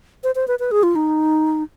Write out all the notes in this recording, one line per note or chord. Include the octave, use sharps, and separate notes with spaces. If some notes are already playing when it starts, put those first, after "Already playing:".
C5
C5
B4
B4
G#4
F4
D#4